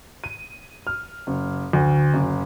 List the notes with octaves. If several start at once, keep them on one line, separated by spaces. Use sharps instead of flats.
D#7
F6
F#1
D2
F#1